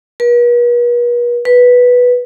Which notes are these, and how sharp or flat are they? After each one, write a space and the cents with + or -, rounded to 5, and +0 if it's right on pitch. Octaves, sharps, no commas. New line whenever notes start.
B4 -45
B4 -5